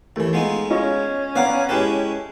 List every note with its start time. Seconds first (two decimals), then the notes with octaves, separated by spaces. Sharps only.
0.16 D#2 E3 A3
0.33 G#3 B3 D#4 F4
0.70 C#4 F4 D#5 C#6
1.36 B3 D5 F5 F#5 A#5 D6
1.69 G#3 E4 G4 A4 B4 G5